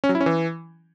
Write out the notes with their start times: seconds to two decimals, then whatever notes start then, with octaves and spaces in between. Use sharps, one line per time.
0.04 C#4
0.09 F#3
0.15 E4
0.21 C#4
0.26 E3